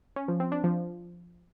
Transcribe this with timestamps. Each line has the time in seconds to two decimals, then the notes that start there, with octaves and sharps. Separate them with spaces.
0.16 C#4
0.28 F3
0.40 C4
0.52 D4
0.64 F3